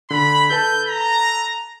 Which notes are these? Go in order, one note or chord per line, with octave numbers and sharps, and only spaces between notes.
D3 B5
A4 B4 A5 G6
A#5